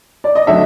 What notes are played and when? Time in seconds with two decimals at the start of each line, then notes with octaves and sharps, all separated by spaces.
0.24 D5
0.35 D#5
0.47 D3 F#3 A3 E5